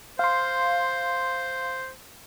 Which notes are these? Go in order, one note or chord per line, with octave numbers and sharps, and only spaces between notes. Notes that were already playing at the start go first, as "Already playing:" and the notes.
C5 F5 C6